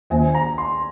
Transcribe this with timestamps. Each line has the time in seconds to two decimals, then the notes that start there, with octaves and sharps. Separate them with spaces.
0.10 D#2 D#3 A#3 F4 C5 G#5
0.35 A#5
0.58 C6